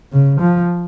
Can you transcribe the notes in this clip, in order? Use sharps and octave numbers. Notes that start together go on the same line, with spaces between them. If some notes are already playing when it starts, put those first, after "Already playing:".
C#3
F3